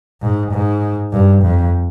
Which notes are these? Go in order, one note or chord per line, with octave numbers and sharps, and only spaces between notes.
G#2
G#2
G2
F2